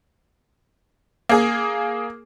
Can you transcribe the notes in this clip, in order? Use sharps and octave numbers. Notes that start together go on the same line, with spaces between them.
A#3 G#4